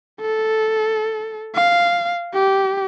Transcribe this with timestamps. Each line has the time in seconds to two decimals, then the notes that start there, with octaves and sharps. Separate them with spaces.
0.21 A4
1.55 F5
2.34 G4